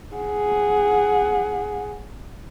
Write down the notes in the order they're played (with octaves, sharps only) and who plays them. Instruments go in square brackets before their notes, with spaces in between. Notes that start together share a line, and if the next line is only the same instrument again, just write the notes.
[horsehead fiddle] G#4 F#5